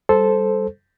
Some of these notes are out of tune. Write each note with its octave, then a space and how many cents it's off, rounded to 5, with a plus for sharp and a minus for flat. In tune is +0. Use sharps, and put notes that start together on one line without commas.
G3 +0 A4 -10 C5 +0